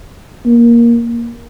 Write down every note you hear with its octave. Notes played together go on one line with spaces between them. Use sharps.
A#3